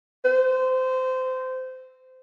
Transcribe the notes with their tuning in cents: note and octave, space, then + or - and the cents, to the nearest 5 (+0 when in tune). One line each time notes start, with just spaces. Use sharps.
C5 -20